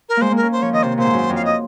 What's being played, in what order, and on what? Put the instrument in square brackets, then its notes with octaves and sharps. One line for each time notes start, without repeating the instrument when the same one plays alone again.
[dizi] A#4
[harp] G#3 A#3 [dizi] C5
[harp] A#3 [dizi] A#4
[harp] C#4
[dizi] C5
[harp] F3 [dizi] C#5
[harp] D#3 [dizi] D#5
[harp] C3 [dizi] C5
[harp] A#2 [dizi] C5
[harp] G#2
F#2
F2
[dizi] F5
D#5